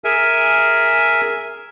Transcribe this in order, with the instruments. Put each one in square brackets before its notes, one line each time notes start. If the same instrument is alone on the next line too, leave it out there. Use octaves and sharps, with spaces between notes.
[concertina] G#4 A#4 E5 G#5